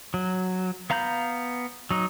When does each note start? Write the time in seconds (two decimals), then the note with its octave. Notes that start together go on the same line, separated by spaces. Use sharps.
0.14 F#3
0.90 B3 F5 A#5 B5 G6
1.91 F#3 D#4